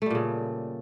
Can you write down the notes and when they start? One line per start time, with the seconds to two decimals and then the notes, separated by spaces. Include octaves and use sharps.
0.02 A3
0.06 G3
0.10 A#2
0.15 C#3